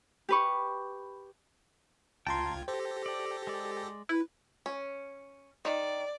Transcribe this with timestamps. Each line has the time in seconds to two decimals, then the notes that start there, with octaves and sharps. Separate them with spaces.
0.29 G4 B4 C#6
2.27 C#2 F4 G5 A5 A#5 C6 G#6
2.68 G4 A4 C5 A#6
3.06 D5
3.47 G#3 D5
4.09 E4 B4
4.66 C#4
5.65 D#3 D5